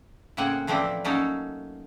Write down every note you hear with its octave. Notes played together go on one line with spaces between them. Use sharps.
A2 C#3 A#3 C4 F#5 G#5
E3 F3 A3 C4 D4 E4
F#3 A3 A#3 C#4 D#4 A4